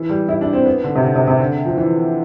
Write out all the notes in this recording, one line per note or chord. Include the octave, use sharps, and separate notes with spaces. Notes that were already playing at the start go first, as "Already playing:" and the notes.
Already playing: E3
G3
E4
D4
C4
B3
D3
C3
D3
C3
C3
D3
F3
E3